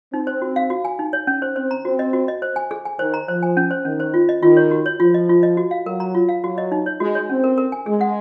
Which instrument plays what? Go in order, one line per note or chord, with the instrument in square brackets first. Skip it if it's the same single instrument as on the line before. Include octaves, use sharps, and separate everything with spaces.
[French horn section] C4 [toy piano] D#4
[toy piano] C5
F#4
F5
F#4
G#5
D#4
C#5
C#4
C5
[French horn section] C4 [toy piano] C5
[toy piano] A#5
[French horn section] C4 [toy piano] F#4
[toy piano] D#5
F#4
D#5
C5
G#5
G#4
G#5
[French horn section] D#3 [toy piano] C5
[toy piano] A#5
[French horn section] F3 [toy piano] C5
[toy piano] G#5
C#4
C5
[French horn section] D#3 [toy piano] C#4
[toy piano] C5
F4
D#5
[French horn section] D#3 [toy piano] F4
[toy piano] C#5
F#4
C#5
[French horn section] F3 [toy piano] F4
[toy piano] D#5
F4
D#5
F#4
F5
[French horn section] F#3 [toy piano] A#4
[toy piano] A#5
F4
F5
[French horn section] F#3 [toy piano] F#4
[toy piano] D#5
D#4
C#5
[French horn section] G#3 [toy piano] F#4
[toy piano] C#5
[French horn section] C4 [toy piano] C#4
[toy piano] A#4
A#4
G#5
[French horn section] G#3 [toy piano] G#4
[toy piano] F#5